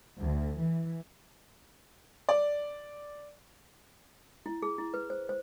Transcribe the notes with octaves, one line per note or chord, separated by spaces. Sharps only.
D2
E3
D5
E4
G#4
E4
B4
C5
C5